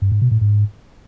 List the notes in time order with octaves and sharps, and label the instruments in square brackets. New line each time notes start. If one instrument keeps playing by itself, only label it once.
[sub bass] G2
G#2
B2
A2
G#2